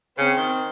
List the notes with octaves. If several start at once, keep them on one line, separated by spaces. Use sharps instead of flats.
C#3 C4
D#3